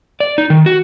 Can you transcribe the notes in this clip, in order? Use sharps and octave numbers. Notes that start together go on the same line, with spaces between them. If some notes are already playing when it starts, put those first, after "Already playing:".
D5
D#4
D#3
F#4